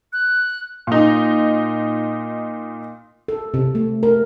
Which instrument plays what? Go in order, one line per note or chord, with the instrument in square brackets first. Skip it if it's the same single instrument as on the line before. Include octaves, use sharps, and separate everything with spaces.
[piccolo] F#6
[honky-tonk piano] A#2 D#4
[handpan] A4
C3
A3
A#4